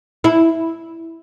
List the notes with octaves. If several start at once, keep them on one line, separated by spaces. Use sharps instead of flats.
E4